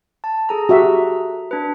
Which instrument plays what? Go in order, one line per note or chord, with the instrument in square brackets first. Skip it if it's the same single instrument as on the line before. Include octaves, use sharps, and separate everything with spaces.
[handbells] A5
G#4 A4 A#5
[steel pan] F#4 G4 E5
[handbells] D4 B4